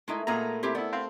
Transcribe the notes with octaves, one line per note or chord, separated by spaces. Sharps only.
G#3 A3 D#4 E4 A#4
A#2 B3 D#4 G#4 A#5
C3 C4 E4 G4 C5 A5
B3 E4 D5
C4 F5